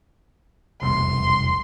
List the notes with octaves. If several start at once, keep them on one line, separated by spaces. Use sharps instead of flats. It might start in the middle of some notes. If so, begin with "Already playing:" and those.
E1 C2 F2 C6